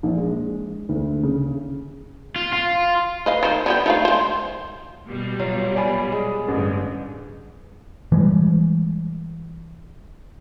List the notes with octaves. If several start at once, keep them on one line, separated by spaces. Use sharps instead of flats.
A#1
G#3
D2
C#3
F4
F4
B4 D#5 F5
D#3 C5
D3 B3 G4
D#3 A3 F5
G#3 C5
B2 G3
F#3 F4
D5 G#5 B5
G#3 G#4
A1 G2 D3
E3 G3 G#3